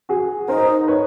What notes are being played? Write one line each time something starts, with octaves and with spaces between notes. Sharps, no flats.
F#4 G#4
D#4 A#4 C5
B4 C#5